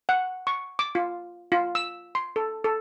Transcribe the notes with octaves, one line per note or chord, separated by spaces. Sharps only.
F#5
C#6
D6
F4
F4
E6
C6
A4
A4